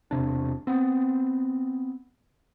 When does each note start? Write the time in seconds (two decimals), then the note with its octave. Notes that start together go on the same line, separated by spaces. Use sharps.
0.11 E1 C3 D4
0.67 B3 C4